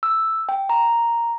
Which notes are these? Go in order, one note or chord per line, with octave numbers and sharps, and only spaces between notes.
E6
G5
A#5